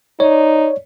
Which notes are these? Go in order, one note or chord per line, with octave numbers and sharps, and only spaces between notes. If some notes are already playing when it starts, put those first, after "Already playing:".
D#4 C#5 D5